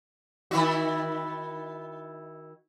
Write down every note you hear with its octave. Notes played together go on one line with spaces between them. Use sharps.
D#3 E4 F#4